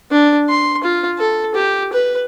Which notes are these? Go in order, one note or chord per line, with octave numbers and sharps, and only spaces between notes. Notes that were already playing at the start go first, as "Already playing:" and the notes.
D4
C6
F4
A4
G4
B4